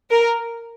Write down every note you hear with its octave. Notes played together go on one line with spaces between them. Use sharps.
A#4